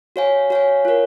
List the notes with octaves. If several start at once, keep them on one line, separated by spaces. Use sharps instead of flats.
F#4 C#5 F5 G#5
F#4 C#5 F5 G#5
F4 A#4 C#5